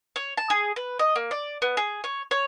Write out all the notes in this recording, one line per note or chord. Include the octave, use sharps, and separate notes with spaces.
C#5
A5
G#4
B4
D#5
A#3
D5
B3
G#4
C#5
C#5